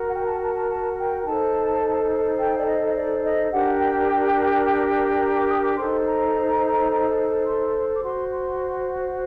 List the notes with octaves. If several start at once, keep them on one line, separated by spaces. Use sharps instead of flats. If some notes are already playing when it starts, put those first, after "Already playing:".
Already playing: F#4 A#4
F#5
G5
A5
A5
A5
A5
G5
D#4 A4 C5 A5
G5
D5
D#5
D#5
D5
D#5
D4 G4 A#4 F#5
G5
A#5
D6
D#6
D6
D#4 A4 C5 C6
A#5
C6
D6
F#4 C5 C6
C6